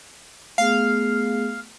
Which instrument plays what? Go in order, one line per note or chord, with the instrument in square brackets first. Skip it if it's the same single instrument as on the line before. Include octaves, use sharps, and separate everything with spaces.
[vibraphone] A3 B3 G#4 [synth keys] F5